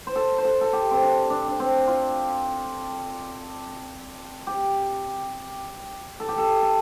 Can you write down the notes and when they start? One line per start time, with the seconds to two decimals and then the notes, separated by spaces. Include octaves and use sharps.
0.07 C5
0.16 A4
0.38 C5
0.45 A4
0.61 A4
0.73 G4
0.91 C4
1.01 D4
1.30 D4
1.48 D4
1.60 C4
1.87 F4
4.47 G4
6.20 A4
6.28 G4
6.38 A4
6.63 A4